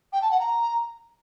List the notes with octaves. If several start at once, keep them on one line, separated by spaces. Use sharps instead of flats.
G5
A5
F#5
A#5